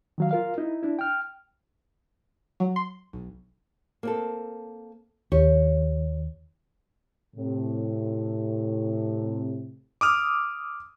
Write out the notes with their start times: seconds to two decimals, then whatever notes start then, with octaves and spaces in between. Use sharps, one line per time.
0.18 D#3 F#3 F5
0.31 F4 A#4 F5
0.58 D#4 E4
0.83 D4 E4
0.99 G5 F6
2.60 F#3
2.76 C6
3.13 B1
4.03 A#3 C4 A4
5.32 D#2 G4 C#5
7.36 A2 C3
10.01 D6 D#6 F6